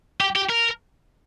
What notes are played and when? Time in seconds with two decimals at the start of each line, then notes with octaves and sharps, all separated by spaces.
0.21 G4
0.36 G4
0.50 A#4